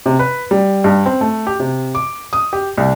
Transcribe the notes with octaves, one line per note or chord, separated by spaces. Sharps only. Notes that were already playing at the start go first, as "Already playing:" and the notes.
C3
B4
G3
G2
C4
A3
G4
C3
D6
D#6
G4
C2